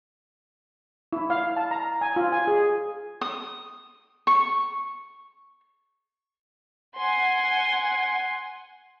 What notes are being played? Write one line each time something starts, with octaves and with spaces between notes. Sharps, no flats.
E4
F5
A5
A#5
G#5
F4
G#5
G#4
D#6
C#6
F#5 G#5 C6